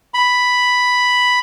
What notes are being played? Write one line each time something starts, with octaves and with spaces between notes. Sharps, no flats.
B5